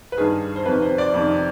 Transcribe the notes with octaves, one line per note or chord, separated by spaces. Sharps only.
B4
G2 D#3 G#4
C5
F2 C3 D#3 B4
C5
D5
F2 C3 D#3